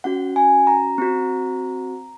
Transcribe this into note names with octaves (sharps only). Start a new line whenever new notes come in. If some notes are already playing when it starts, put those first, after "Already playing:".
C#4 F#4 F#5
G#5
A#5
C4 F#4